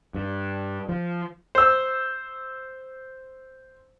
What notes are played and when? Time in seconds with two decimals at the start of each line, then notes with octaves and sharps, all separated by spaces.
0.14 G2
0.89 F3
1.55 C5 E6